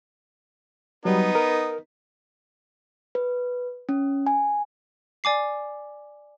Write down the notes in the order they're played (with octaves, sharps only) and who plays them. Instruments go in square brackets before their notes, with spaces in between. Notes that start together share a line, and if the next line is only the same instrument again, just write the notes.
[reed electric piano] F#3 G3 [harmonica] B3 D#4
[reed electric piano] A#4
[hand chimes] B4
C#4
G#5
[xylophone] D5 G#5 D6 C7